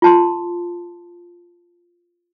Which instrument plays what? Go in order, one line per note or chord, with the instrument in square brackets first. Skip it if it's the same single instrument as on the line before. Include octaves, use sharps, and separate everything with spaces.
[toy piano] F4 A5 C6